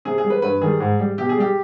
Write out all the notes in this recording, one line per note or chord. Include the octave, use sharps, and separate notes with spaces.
C3 G#4
G#4
G3
B4
G2 B4
D#3 G3 G#4
G#2
G3
B2 G4
G#4
G3 G4